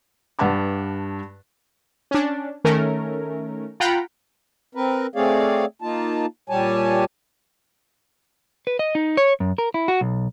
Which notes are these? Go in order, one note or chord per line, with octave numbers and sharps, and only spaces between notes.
G2 B4 F#5 A5 D6
C#4 D4
D#3 A3 C#4 A#4
F4 F#5 G5 A#5 B5
C4 A#4 B4
A3 C4 G#4 C#5 D5 F5
A#3 D#4 F4 A5
A#2 G3 G4 C#5 G#5 A5
B4
D#5
D#4
C#5
F#2
A#4
E4
F#4
B1